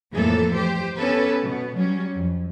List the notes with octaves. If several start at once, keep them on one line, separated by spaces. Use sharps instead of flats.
F2 A2 E3 A#3 A4
G4 C5
B3 C#4 G4 A4 B4
B2 B3
F#3 G3 C#4
F2